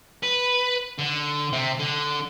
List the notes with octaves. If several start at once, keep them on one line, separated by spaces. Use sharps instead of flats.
B4
D3
C3
D3